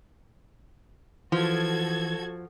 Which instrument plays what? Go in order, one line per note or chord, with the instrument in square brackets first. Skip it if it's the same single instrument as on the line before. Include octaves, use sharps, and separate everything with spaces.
[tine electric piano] E3 [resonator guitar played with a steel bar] F3 [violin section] F#4 A4 G#6